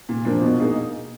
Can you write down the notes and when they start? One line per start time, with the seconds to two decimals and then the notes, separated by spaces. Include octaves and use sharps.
0.09 A#2
0.25 F3 A#3 D4
0.42 B2
0.59 A#3 D#4 G#4